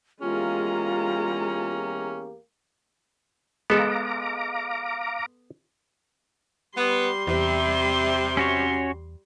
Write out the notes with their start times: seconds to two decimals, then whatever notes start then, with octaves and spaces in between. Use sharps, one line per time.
0.21 E2 G#3 A#3 C#4 F4 G4 A#5
3.70 G#3 B3 A4 F5 A#5 D6
6.77 G3 B3 C6
7.27 E2 C3
8.37 C#4 F#4 C#5